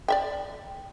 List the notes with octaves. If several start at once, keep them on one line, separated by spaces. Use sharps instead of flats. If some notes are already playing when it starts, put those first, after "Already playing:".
D5 E5 G5